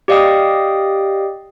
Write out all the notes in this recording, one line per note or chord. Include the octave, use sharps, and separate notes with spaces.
G4 D5 D#5 F5 G5 D#6